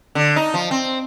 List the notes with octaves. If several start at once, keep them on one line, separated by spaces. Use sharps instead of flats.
D3
D#4
F3
C4